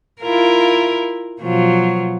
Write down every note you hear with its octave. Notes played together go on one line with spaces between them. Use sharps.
E4 F4 A#4
B2 F3 F#3